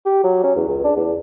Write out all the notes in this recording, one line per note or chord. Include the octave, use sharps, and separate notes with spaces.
G4
F#3
C#4
E2
C#2
D4
E2